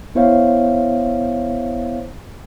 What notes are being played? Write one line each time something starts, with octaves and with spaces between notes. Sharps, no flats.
B3 E4 C5 C#5 E5 F5